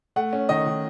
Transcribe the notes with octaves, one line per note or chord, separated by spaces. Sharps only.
A3 F#5
C#4
D#3 D#5
D#3